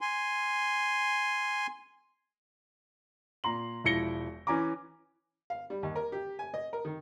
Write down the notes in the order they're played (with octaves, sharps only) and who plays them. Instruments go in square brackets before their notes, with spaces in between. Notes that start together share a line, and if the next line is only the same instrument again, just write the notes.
[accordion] G#5 C6
[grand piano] A#2 A#5 C6 F#7
E1 F3 E4 A#6 C#7 G7
E3 C#4 G#5 A#5 D6
[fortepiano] F5
G3
D#2
A#4
G4
G#5
D#5
A#4
D#3